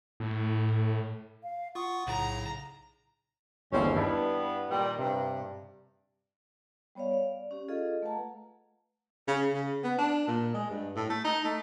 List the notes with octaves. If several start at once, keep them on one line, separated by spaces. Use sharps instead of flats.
A2
F5
F4 F#5 C#6 D#6
B1 A2 C#3 A#5
G1 D#2 G#2 E3 C4 C#4
G2 B3 D4 E4
A#2 D#3 G3
G2 C3
G3 B3 C#5 D5 F5
D5 F5
C#4 G4
F4 G#4 A4 D#5 F5
A3 B4 F5 F#5 A5 A#5
C#3
C#3
B3
D4
A#2
G#3
G2
A2
A3
D#4
A3